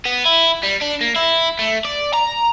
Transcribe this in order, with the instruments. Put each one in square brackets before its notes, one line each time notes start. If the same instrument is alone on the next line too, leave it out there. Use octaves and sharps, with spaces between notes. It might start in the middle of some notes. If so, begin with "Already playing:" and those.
[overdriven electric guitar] B3
E4
G3
D4
A#3
E4
A3
D5
A#5